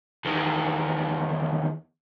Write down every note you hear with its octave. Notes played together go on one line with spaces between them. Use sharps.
E2 D#3